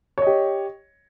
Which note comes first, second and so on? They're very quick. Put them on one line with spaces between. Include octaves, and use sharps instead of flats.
C#5 D#5 G4